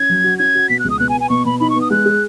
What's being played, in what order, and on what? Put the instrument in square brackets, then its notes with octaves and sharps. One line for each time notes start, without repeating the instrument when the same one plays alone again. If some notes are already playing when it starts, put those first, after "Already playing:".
Already playing: [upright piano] C#4 [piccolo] G#6
[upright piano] F#3
F#4
[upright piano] C#4 [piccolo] G#6
[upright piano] F#4
[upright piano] B2 [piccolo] B6
[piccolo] F#6
[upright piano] C#2
[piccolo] D#6
[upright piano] B2 [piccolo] F#6
[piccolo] G#5
[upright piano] B3
[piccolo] G#5
[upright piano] B2 [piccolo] C#6
[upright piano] B2 [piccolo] B5
[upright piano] D#4 [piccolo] B5
[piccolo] C#6
[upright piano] B3
[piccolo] D#6
[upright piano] G#3 [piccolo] F#6
[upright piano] G#4